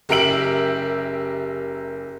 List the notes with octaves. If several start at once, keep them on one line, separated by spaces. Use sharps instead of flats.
F#1 G4 A#4 E5 D7 F#7